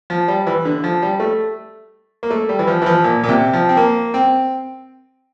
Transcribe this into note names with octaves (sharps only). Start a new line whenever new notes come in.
F3
G3
E3
D3
F3
G3
A3
A#3
A3
G3
E3
F3
E3
F3
A#2
A#2
C3
F3
C4
A#3
C4